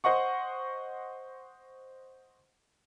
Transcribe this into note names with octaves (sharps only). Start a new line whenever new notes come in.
C5 D#5 F#5 C#6